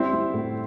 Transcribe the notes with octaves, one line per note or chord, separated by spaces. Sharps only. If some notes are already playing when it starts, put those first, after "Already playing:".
Already playing: G3 C4 E4
G3
A2